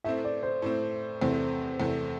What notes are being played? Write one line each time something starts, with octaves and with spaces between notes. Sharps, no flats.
A2 A3 C4 E5
D5
C5
A2 A3 C4
E2 C3 A3 C4
E2 C3 A3